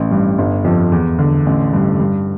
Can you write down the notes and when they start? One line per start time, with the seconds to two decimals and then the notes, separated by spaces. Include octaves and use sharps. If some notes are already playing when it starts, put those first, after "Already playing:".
Already playing: A1
0.11 G2
0.38 G1
0.64 F2
0.92 E2
1.19 D3
1.46 A1
1.73 G2
1.99 G2